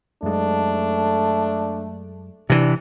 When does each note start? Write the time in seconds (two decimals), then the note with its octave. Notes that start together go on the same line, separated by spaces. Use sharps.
0.23 F#2 G#3 A3 D4
2.50 C3 E3 D4